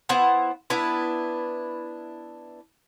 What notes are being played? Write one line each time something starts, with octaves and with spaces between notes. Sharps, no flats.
B3 E4 C5 F#5
B3 D4 E4 B4